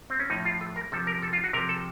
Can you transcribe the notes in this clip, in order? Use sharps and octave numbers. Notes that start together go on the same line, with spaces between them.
C4
C#4
A2 F3 D#4
F4
A4
A#4
C3 F3 A4
A#4
A4
F4
F#4
C3 F3 A#4
A4